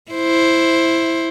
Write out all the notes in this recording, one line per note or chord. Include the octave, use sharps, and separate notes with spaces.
E4 C5